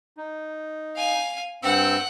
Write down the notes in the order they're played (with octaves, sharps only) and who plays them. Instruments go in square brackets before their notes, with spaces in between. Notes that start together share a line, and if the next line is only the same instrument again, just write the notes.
[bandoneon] D#4
[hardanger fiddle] F5 G#5
[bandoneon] G2 C4 E6 [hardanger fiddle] F#5 G5